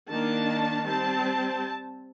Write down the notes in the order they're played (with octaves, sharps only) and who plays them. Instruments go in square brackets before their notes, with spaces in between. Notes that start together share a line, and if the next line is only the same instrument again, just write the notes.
[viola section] D#3 A#3 D4 A5
G3 C4 A5